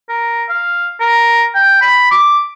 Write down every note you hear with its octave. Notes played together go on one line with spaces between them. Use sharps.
A#4
F5
A#4
G5
B5
D6